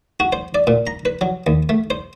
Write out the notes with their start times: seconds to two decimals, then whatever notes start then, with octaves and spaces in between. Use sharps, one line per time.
0.20 F#4
0.33 C5
0.55 D5
0.67 A#2
0.87 A#5
1.05 B4
1.21 F#3
1.47 D#2
1.69 A3
1.90 C5